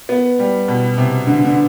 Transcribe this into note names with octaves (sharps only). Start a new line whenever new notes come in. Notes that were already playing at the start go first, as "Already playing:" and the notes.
B3
G3
B2
C3
D3
D3